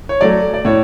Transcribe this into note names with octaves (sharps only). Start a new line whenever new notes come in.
C#5
F#3 A3 D5
D5
A2 C#5